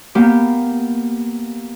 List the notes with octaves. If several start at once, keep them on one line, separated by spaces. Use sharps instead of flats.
A#3 B3 G4